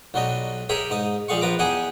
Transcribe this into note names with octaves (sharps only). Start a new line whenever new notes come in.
B1 F#3 G3 D#5
G4 G#4 A#4 C#5 E5
G#2 D#4 D#6
A#1 G3 G#4 F5 C#6
A#1 F3 B4 A#5 D6
E2 D#4 G4 G#4 F#5 G#5